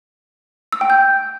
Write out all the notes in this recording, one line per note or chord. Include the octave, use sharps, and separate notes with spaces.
E6
G5
G6